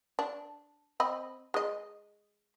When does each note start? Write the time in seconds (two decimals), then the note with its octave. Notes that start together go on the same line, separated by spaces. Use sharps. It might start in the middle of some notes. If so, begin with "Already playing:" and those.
0.19 D4
1.00 C4 D#5 B5
1.54 G#3 D#5